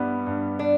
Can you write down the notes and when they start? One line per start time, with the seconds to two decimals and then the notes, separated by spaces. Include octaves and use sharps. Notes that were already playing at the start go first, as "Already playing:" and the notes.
Already playing: G2 G3 B3 E4
0.27 G2
0.59 D4